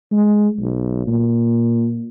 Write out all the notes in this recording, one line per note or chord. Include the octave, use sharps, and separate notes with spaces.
G#3
B1
A#2